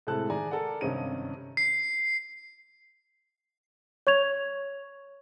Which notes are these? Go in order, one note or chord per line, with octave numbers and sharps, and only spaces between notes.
A2 C3 G#3 A4 A5 F#6
D#3 G#4 D5 G#5 A#5
A4 A#4 D5 F#5
G#1 G2 C3 C#4 D#4 D#7
C7
C#5 C#6 G#6 F7